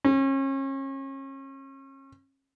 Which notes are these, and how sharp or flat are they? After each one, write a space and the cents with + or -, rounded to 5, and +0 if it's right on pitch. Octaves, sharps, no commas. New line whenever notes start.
C#4 -35